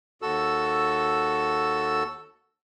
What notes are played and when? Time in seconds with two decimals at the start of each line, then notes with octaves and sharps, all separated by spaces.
0.22 D#2 F#4 A4 E6